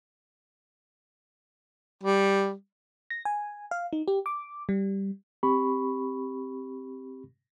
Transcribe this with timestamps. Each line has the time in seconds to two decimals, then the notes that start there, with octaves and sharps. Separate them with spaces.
2.03 G3
3.10 A#6
3.25 G#5
3.71 F5
3.93 D#4
4.08 G4
4.26 D6
4.69 G3
5.43 C4 G4 B5 C#6